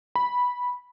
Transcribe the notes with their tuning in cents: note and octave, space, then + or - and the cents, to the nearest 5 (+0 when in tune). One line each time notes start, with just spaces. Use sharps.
B5 -10